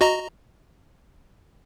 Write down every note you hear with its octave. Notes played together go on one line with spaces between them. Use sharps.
F#4 D#5 A#5